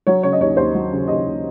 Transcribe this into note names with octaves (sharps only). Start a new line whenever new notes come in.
F#3 C#5
C#3 C#5
D#5
D#2 C#5
D#2 C5
F#3
C#3
D#2 D#5
D#2